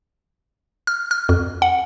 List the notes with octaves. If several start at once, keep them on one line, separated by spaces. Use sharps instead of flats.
F6
F6
F2
F#5